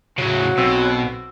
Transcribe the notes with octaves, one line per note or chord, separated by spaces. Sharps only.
A2 C#3 F#3 F#4 C5
B1 B2 C4 E6